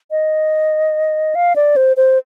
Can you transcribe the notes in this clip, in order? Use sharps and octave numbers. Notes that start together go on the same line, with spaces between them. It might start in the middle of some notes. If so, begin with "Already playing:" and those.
D#5
F5
D5
C5
C5